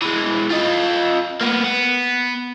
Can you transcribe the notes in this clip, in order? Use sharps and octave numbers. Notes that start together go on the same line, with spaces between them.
E3 G#3
F4 D#5
A#3 B3
B3